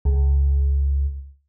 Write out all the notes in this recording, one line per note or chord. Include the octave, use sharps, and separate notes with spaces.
C#2